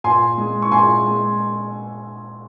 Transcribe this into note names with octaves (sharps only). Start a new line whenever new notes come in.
A#2 G#5 C6
G#3
C#6
A#2 G#5 C6
G#3